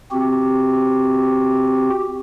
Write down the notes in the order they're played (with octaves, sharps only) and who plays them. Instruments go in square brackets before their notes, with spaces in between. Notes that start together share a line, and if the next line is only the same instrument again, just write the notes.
[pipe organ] C4 F#4 G4